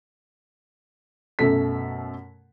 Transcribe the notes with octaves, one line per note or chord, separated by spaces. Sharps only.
F#2 B2 A3 A4 B6